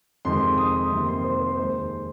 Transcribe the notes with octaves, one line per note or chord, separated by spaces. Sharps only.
F2 C3 D#3 G#3 C6
D#6
F2 C3 D#3 A#3 C6
C6
C5
C5
D#2 D#3 G#3 C5